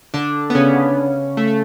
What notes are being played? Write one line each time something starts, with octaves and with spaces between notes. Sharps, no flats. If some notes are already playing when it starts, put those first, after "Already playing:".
D3 D4
B3
C#3 C#4
A3
A3